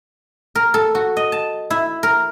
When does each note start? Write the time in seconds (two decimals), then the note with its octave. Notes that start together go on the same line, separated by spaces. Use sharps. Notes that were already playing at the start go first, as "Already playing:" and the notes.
0.55 A#4
0.74 A4
0.95 F#4
1.17 D#5
1.32 A5
1.70 E4
2.03 A#4